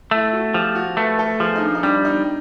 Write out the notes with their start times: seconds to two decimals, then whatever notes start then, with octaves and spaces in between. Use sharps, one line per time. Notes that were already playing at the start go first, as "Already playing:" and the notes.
0.11 A3 E4
0.33 F#4
0.54 F3 G4
0.75 F#4
0.97 A3 B4
1.19 A4
1.40 F3 G#4
1.56 D#4
1.62 D4
1.75 D#4
1.83 G3 D4
2.05 D#4